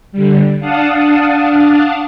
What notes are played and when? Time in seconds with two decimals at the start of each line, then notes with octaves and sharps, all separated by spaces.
0.12 D3 G3
0.59 D4 F5 F#5 A5 D#6